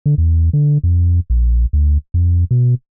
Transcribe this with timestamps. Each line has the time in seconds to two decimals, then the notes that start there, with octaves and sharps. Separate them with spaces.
0.06 D3
0.18 E2
0.53 D3
0.83 F2
1.30 A#1
1.73 D2
2.14 F2
2.51 B2